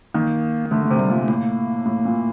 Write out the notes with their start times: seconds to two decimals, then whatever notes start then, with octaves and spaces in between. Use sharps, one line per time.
0.14 D#3 A#3
0.71 D3 A3
0.86 C3 A3
0.99 G3
1.10 A#2 A3
1.24 A3
1.28 A2 A#3
1.86 A2
2.05 A#2